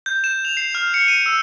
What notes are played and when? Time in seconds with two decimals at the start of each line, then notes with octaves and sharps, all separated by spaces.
0.06 G6
0.24 E7
0.45 F7
0.57 C7
0.75 F6
0.94 C#7
1.08 D#7
1.26 E6